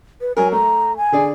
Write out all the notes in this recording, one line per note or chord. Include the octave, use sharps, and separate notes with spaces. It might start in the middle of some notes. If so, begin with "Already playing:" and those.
B4
F#3 A#4 G#5
A3 A#5
G#5
D3 G#4 D5